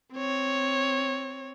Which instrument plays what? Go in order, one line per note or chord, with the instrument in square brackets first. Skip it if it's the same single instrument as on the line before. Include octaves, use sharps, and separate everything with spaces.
[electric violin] C4 C#5